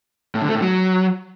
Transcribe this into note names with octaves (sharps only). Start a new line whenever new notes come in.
A2
D3
A3
A2
F#3